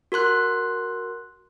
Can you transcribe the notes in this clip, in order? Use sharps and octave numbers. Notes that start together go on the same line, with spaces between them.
F#4 A#4 C6 F#6